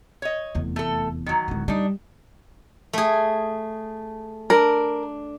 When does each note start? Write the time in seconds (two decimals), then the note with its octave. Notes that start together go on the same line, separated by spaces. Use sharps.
0.22 C#5 D#5
0.55 F1 E2
0.76 A3 A4
1.26 D#3 F#3
1.48 D1 G#3
1.68 G3 D4 D#4
2.93 A3 G#4
4.50 D4 A#4